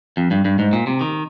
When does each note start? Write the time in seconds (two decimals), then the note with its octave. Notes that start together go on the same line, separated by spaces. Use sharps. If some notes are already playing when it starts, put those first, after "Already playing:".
0.17 F2
0.31 G2
0.45 G2
0.59 G#2
0.73 A#2
0.87 C3
1.01 D#3